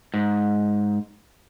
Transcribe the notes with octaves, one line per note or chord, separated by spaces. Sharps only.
G#2